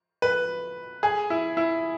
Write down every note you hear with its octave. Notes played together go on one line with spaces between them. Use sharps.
B4
G#4
E4
E4